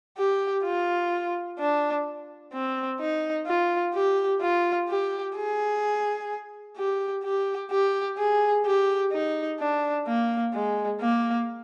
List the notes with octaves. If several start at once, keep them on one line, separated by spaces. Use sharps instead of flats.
G4
F4
D4
C4
D#4
F4
G4
F4
G4
G#4
G4
G4
G4
G#4
G4
D#4
D4
A#3
G#3
A#3